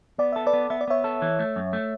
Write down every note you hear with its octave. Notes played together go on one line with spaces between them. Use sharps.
B3 D5
A4 E5
B4 D5
B3
B3 E5
D5
B3 C#5 E5
A4
E3
A3
F#2
A3